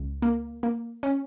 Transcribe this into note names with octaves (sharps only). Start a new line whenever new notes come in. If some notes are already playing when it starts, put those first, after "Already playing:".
Already playing: C#2
A#3
A#3
C#4